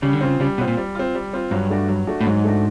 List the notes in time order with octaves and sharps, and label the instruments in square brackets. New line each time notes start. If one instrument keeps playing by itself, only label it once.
[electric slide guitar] C#3 [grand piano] G3
[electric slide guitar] D3
[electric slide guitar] C#3 [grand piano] C4 F4
[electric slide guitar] C#3 [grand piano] G3
[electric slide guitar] B2 [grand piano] C4 F4
[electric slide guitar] A#2
[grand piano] G3
C4 F4
G3
C4 F4
[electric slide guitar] G2 [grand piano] F#3
[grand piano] A3 D4 F#4
F#3
A3 D4 F#4
[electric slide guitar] A2
[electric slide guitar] G#2 [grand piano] F#3
[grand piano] A3 D4 F#4